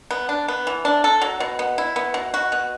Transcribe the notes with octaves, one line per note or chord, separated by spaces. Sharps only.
B3
D4
B3
E3
D4
A4
F#3
B2
B3
E4
B3
B2
F#4
B2